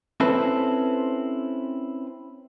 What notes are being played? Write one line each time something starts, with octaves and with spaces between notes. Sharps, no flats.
C4 C#4 E4 A4 B4 C5